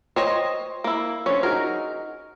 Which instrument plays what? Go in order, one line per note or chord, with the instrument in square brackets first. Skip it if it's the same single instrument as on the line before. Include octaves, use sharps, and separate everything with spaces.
[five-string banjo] C5 C#5 D#5 [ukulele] G5
[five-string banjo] A#3 E4
[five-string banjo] C#4 [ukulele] D4 C5 C#5
[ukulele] D#4 F#4 G#4 [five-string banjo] A#4